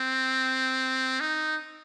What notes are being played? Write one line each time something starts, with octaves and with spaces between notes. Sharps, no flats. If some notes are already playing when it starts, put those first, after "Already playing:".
Already playing: C4
D#4